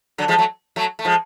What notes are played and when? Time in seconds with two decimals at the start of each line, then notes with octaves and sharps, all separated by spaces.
0.18 D3 F#3
0.28 F3 G#3
0.38 F#3 A3
0.76 F#3 A3
0.99 A3
1.05 F3 G#3